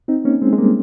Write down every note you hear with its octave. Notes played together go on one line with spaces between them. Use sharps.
C4 D#4
A#3 C#4
G#3 C4
G#3
G3 A#3